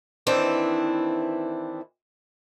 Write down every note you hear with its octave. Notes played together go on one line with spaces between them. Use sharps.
D#3 E3 C4 D4 E4